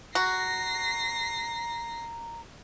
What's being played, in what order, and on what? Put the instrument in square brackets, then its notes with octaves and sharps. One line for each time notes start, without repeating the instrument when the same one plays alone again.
[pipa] F#4 [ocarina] A#5 [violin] A#6 C7